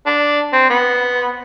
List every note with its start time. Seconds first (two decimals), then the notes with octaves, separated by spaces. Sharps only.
0.06 D4
0.53 C4
0.70 B3